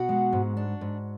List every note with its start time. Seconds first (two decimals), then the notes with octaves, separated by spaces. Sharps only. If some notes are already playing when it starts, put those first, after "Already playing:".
Already playing: B2 F#4 F#5
0.09 G#3
0.33 G#2
0.57 D4
0.81 G#2